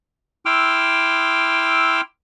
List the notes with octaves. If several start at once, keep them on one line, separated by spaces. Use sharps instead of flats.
E4 G5 C6 D6 E6 F6